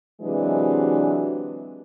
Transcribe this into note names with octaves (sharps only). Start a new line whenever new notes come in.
C3 E3 F#3 G#3 D4